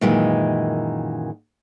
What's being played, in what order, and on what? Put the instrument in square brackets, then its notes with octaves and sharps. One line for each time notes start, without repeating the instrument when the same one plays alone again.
[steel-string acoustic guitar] F#2 A#2 D#3 E3 G#3